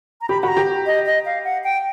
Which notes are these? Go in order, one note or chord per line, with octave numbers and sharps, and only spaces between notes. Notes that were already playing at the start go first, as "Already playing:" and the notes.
A#5
G4 B5
F#4 B5
A#5
G4
D#5
D#5
F5
F#5
G5